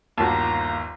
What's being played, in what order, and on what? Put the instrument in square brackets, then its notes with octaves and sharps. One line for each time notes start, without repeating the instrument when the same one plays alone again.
[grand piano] G1 D#2 [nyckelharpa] F4 A#5 [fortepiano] F#4 A5